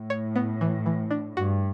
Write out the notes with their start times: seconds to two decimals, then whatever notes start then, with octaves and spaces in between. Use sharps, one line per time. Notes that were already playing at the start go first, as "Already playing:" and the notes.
Already playing: A2
0.10 C#5
0.36 B3
0.61 E3
0.86 E3
1.11 D4
1.37 G2 F#4